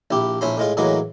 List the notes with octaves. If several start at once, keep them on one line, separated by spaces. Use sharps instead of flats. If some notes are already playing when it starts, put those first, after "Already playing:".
A#1 E4 G4
A#1 C#4 E4 C5 B5
A2 G#3 F4
A2 E3 F#3 G#3 A#3